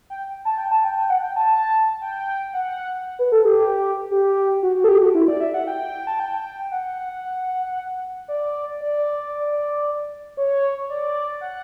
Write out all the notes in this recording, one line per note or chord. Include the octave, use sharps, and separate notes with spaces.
G5
A5
G5
A5
G5
G5
F#5
G5
A5
G5
F#5
B4
A4
G4
G4
F#4
F#4
A4
G4
F#4
E4
D5
E5
F#5
G5
A5
G5
F#5
D5
D5
C#5
D5
F#5